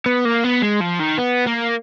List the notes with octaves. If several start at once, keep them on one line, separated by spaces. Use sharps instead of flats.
B3
A#3
B3
G#3
F3
D#3
B3
A#3